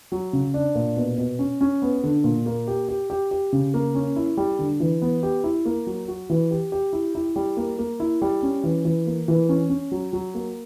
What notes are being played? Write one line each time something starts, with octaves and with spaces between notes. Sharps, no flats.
F#3
C#3
D4
A#2
B2
B2
C#4
C#4
B3
D3
A#2
A#3
G4
G4
G4
G4
C#3
A#3
C#4
E4
G3
D3
E3
B3
G4
E4
A#3
F#3
F#4
E3
G4
G4
E4
E4
G3
A#3
A#3
E4
G3
C#4
E3
E3
A#3
E3
C#4
C#4
F#3
F#3
A#3